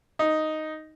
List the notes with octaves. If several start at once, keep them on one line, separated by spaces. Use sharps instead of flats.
D#4